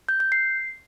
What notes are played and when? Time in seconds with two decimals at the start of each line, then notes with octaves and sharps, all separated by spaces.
0.09 G6
0.20 G6
0.32 C7